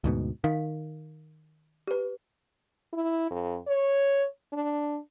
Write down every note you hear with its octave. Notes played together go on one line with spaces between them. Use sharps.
D2 G#2 B2
D#3 F5
G4 B4
E4
F2
C#5
D4